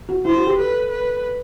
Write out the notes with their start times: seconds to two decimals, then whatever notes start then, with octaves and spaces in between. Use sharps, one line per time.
0.09 F#4
0.25 E4 C5
0.37 F#4
0.47 G4
0.58 A4 B4
0.91 B4